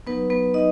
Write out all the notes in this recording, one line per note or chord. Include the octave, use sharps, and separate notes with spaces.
F#3 B3 D#4 B4
B3 B4
F#3 B3 D#4 D#5